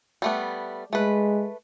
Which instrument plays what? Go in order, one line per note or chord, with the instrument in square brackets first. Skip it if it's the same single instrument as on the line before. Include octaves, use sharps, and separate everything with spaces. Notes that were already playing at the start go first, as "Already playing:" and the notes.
[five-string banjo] G3 A3 B3
[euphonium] G#3 [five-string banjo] A3 B4